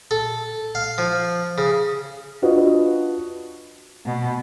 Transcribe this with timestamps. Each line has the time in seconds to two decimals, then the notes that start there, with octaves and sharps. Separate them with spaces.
0.11 A4
0.75 F5
0.98 F3
1.58 C#3
2.42 D4 F4 F#4 B4 D#5
4.05 B2